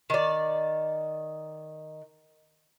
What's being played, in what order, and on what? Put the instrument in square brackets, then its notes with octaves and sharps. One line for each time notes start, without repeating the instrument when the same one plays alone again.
[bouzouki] D#3 D5